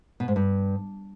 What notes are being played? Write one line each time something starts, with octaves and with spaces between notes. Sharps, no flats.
B2
G#2
G2